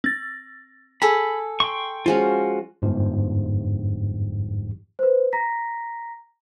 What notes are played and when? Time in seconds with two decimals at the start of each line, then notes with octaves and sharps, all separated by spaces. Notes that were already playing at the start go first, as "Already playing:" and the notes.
0.04 C4 A6
1.02 G#4 A4 B5
1.60 G5 C6 C#6
2.06 F3 G#3 C#4 F4 F#4
2.82 G1 F2 G#2 F3 G4
4.99 B4 C5
5.33 A#5 A#6 B6